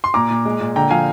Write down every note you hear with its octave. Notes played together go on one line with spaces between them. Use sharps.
C6
A#2 A#5 D6
A#2
G#3
A#2
D3 G5 A#5
F3 F5 G#5